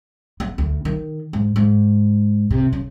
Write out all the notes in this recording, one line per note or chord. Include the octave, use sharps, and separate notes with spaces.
B3
D2
D#3
G#2
G#2
C3
C#3